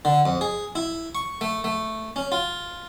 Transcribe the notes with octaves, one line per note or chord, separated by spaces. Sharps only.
D3
F2
G#4
E4
C#6
A3
A3
C#4
F4